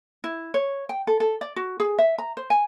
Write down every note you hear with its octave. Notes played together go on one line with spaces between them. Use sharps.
E4
C#5
G5
A4
A4
D5
F#4
G#4
E5
A#5
C5
G#5